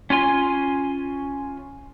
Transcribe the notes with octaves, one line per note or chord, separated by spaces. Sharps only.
C#4 F4 G#5 C6